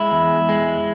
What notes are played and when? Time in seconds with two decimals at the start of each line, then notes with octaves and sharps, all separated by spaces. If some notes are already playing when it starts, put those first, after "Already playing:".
Already playing: G#3 E4
0.12 E2
0.49 G#3